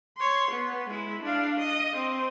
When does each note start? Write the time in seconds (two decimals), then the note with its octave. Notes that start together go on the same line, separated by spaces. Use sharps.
0.17 C#5 C6
0.52 B3
0.90 G#3 E4
1.23 D4 F5
1.59 D#5
1.94 C4